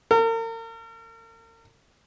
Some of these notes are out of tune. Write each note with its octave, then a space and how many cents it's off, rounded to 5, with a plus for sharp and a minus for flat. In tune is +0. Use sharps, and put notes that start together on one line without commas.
A#4 -40